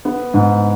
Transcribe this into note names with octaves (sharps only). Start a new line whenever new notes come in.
B3
G#2